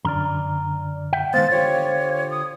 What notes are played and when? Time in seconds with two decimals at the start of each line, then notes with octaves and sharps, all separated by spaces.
0.05 F#2 D3 D5 A#5 F6
1.13 E5 F#5 G5
1.34 D#3 G#3 B3 C5 F5 A6
1.50 D3 F4 G4 C#5
2.31 D#6